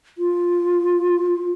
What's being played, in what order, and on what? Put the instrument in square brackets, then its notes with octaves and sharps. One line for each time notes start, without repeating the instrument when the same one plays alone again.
[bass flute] F4